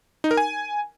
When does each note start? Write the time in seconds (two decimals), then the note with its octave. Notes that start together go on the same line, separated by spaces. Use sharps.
0.24 D#4
0.31 A#4
0.37 G#5